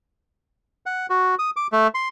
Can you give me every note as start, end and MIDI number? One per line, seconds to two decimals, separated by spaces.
0.86 1.06 78
1.10 1.35 66
1.39 1.50 87
1.57 1.67 86
1.72 1.87 57
1.94 2.08 84